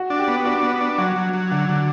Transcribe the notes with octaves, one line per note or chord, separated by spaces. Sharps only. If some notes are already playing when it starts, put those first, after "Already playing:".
Already playing: F#4
D4
G4
B3
D4 F#4
B3
D4
F#3 F#4
F#3
F#3
D3 F#4
D3